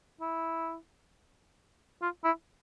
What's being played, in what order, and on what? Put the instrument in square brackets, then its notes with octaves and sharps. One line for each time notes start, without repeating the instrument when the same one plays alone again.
[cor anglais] E4
F4
E4